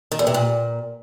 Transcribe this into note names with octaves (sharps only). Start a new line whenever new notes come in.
D#3
E2
C3
A#2